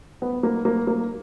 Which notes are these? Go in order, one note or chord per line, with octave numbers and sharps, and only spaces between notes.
B3
A#3
A#3
A#3